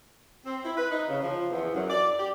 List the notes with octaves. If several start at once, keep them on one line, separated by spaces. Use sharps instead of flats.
C4
E4
B4
D#4
C#3
F3
E2
F#2
D5
G4